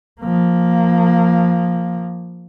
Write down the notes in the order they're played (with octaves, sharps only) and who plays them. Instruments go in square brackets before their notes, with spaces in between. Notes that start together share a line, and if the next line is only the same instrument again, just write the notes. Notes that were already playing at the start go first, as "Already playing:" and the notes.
[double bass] F3 A#3